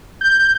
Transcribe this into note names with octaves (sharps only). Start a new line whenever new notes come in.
G6